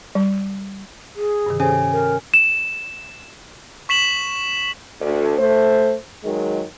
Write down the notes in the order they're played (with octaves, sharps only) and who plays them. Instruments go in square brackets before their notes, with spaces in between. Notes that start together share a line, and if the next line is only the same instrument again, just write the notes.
[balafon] G3
[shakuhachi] G#4
[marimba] G2 C3 D#3
[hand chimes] C#4 G#5 [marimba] G4 A4 C5
[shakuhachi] A#4
[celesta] E7
[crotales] C#6 B6 E7 F#7
[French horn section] D2
A3 C5
D#3 F#3 G#3